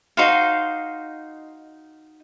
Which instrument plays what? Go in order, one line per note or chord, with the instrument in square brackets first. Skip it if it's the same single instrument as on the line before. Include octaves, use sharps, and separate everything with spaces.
[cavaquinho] D#4 F#4 C5 F5